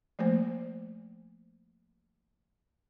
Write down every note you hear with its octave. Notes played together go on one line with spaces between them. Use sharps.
F3 A3 A#3 C5